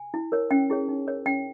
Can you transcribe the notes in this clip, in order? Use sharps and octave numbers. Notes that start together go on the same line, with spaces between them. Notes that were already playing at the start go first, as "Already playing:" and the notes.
Already playing: G#5
E4
A#4 C#5
C#4 G5
E4 G#4 C#5
D#4
A#4 C#5
C#4 G5